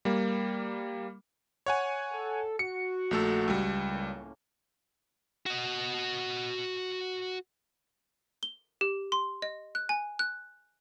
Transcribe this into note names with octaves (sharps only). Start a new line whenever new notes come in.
G3 A#3
C#5 F#5 G#5
A4
F#4 C#7
A#1 A3 A4
C#2 G3
A2 A#3 C#4
F#4 D#5
G7
G4
C6
D#5
F#6
G#5
F#6